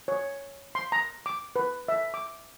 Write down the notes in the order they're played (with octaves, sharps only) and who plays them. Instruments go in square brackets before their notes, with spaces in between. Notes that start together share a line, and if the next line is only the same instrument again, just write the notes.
[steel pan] C#5
C6
A#5
D6
B4
E5
D6